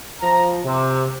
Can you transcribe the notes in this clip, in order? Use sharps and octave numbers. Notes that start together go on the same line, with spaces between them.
F3 A#5
C3